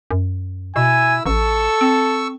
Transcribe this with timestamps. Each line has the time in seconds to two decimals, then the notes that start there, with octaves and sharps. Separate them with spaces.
0.11 F#2
0.76 B2 E4 G#5 E6
1.26 A1 A4 C#6 E6
1.81 C4